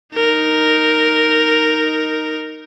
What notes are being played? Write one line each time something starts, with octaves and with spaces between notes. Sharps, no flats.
D#4 A#4